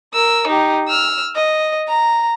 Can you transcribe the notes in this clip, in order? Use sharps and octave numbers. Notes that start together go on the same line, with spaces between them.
A#4 E6
D#4 G4
E6 F6
D#5
A#5